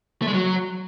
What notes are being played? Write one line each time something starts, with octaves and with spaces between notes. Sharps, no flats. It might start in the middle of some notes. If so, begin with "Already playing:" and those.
A3
G#3
F#3